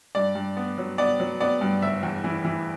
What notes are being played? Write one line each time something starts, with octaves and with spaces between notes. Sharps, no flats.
G2 D5
G2
B3
F#3
B3 D5
F#3
B3 D5
G2
F#1 E5
E2
E3
E3